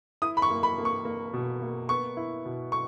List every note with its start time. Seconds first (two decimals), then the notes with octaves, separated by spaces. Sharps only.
0.22 E4 D#6
0.37 B5
0.42 C#6
0.50 A#3
0.63 B5
0.78 A#3
0.85 C#6
1.05 A#3
1.33 B2
1.62 A#3
1.89 B3 C#6
2.17 E4
2.45 B2
2.72 C#6